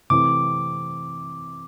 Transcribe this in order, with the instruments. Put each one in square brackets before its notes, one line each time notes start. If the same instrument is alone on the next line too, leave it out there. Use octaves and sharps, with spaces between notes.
[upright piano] C3 E3 A3 C4 [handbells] D6